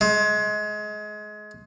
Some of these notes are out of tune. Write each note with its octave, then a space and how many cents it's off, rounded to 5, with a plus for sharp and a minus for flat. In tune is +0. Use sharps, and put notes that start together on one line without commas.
G#3 +25